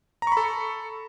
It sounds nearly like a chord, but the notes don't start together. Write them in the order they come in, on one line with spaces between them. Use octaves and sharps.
A#5 C#6 B5 A4